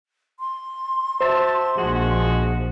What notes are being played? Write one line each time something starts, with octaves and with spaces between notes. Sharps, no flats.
C6
F#4 C5 E5 A5
A#1 F3 G#3 F#4